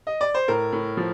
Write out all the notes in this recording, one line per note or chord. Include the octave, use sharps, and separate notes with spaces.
D#5
D5
C5
A2 A#4
A2
F3